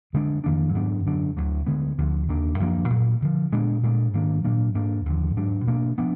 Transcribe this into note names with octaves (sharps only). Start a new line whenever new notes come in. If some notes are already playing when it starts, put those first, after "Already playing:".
F2 D3 G#3 D4
F2 D#3 A#3 D4
G#2 F#3 B3 D4
F#2 D3 F#3 D4
D2 D3 F#3
D2 D3 G#3 B3
D2 D3 F3
D#2 D#3 A#3 D4
F#2 F3 A#3 D4
A#2 F#3 A#3
D2 D3 F3
A#2 G#3 B3 D4
A#2 G#3 B3 D4
G#2 D#3 A#3 D4
A#2 F#3 A#3 D4
G#2 F#3 A#3 D4
D#2 D3 F3
G#2 F#3 D4
B2 A#3 D4
F3 B3 D4